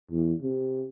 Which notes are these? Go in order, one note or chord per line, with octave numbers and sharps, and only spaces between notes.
E2
C3